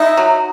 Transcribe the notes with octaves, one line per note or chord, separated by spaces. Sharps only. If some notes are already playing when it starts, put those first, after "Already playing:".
Already playing: D#4 E5
F#3